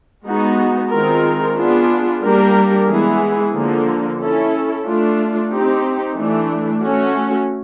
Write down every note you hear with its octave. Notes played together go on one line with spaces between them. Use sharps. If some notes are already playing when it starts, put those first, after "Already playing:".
G#3 B3 D#4 F#4
D#3 G#3 C4 F4 A#4
B3 D4 F4 G#4
G3 A#3 D4 G4 A#4
E3 G#3 B3 E4 G#4
D3 F3 A#3
C#4 E4 A4
A3 D4 F4
C4 D#4 G4
E3 A3 D4
A3 C#4 F#4